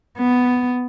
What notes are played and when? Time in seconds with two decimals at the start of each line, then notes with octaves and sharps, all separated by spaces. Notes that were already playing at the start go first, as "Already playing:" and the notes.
0.18 B3